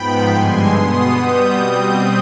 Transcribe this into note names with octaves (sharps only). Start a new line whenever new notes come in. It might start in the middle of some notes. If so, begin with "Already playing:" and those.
Already playing: G#2 F3 B3 G5 B5
G2 D3 G#3 G#5 C6
B2 B3 C6 D#6
B2 G3 B3 D#6 G6
B2 G3 C4